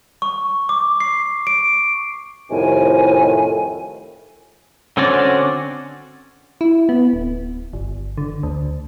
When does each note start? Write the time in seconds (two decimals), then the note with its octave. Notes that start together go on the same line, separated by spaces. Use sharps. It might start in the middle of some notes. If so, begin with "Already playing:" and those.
0.22 C#6
0.69 D6
1.00 C7
1.47 D7
2.51 C2 F2 A2 C3 D#3 G#5
4.97 D3 C4 C#4 F#4 D5
6.61 E4
6.89 B3
7.13 D1
7.73 G1
8.18 D3
8.43 D2